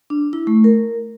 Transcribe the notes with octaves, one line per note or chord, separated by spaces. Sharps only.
D4
E4
A3
A#4